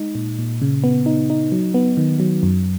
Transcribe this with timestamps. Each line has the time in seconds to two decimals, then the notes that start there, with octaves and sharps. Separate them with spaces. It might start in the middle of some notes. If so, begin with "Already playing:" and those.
Already playing: G#3 D#4
0.15 A#2
0.39 A#2
0.62 C#3
0.84 B3
1.06 D#4
1.30 D#4
1.52 F#3
1.74 B3
1.97 D#3
2.20 F#3
2.43 F#2